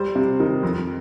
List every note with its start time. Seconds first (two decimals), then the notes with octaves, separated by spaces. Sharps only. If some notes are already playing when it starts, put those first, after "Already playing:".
Already playing: G3 C5
0.16 C3
0.40 D#3
0.63 F2